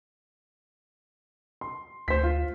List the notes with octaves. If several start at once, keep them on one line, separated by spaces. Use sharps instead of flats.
C6
D2 C5 B6
F4